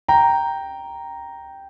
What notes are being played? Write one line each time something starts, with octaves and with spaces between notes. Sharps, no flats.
G5 A#5